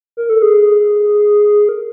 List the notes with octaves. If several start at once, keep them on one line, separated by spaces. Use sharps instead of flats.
A#4
A4
G#4
A#4